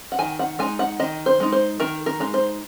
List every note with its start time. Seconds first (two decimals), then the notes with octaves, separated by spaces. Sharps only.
0.12 F#5
0.19 D#3 G#5
0.39 F#5
0.59 G#3 D#4 G#5
0.79 F#5
1.00 D#3 D#5
1.26 C5
1.40 G#3 D#4
1.52 C5
1.80 D#3 A#4
2.06 A#4
2.20 G#3 D#4
2.34 C5